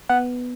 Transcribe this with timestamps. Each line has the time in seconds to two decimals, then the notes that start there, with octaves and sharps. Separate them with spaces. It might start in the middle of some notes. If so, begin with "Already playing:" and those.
0.09 B3 F#5